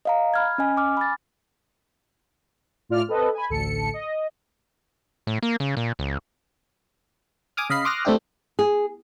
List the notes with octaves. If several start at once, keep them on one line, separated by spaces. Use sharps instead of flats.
D#5 F5 A#5
B5 F6 G#6
C#4 D#5 G#5
G#5 D6 F6
B5 A6
A2 F4 D5 F6
C4 A4 B4 D#5
G#5 B5
A1 D2 A4 C#7
D#5
A2
A#3
C#3
A#2
C#2
G#5 D6 D#6 F6
C#3 D#5 F5 B5 C7
C6 D6 D#6 F6 F#6 A#6
A3 C4 D4 E4 G4
G#4